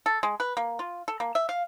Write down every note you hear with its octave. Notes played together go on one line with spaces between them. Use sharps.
A4
G#3
B4
A#3
F4
A4
A#3
E5
F5